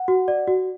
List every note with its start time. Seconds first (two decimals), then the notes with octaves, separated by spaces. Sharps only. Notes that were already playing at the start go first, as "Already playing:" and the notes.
Already playing: F#5
0.08 F#4
0.28 D5
0.48 F#4